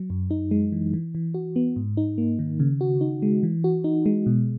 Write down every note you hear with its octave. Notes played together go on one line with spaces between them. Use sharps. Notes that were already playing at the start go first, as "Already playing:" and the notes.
Already playing: F#3
F#2
D#4
G#3
E3
E3
E3
F#4
B3
G#2
D#4
A#3
D#3
C#3
F#4
D#4
G#3
E3
F#4
D#4
G#3
B2